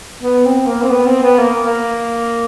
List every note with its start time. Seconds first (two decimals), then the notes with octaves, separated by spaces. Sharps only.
0.22 B3
0.45 C4
0.67 A#3
0.82 C4
0.89 B3
1.06 C4
1.22 B3
1.39 A#3
1.65 A#3